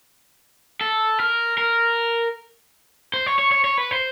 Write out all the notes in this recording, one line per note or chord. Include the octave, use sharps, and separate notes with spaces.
A4
A#4
A#4
C5
C#5
C#5
C#5
C#5
B4
C5